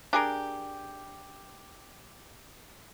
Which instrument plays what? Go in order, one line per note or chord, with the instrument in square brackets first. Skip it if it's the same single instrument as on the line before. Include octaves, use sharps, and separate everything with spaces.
[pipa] D4 G#4 A#4 [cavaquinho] G4